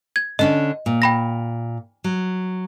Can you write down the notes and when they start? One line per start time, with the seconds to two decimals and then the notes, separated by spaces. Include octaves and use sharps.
0.16 G#6
0.39 D3 C#4 D4 D#5
0.86 A#2
1.02 G5 B5 A#6
2.04 F#3